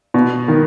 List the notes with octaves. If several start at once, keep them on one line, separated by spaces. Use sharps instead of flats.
B2
D#3